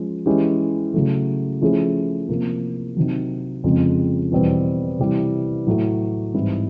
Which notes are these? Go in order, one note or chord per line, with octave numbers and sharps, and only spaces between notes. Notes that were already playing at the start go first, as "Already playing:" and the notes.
Already playing: F3 G#3 C#4
E3 G#3 C#4 E4 G4
C#3 F#3 A3
F3 A3 C#4 E4 G#4
C3 F3 A#3
C3 D#3 F#3
F2 C#3 F3 G#3 C4
E2 B2 G3 C4
C3 E3 G3
A2 F#3 A3
G#2 E3 G3 C4 E4